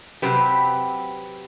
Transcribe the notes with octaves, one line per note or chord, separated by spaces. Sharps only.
C3 F#3 C4 G4 B4